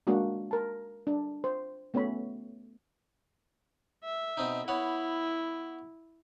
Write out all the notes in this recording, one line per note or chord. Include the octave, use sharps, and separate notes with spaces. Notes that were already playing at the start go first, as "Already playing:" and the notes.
G#3 A#3 D4 F#4
A#4 A5
D4
C5
A3 B3 C#4 C#5 B5
E5
B2 C4 D#4
B3 E4 C#5 F#5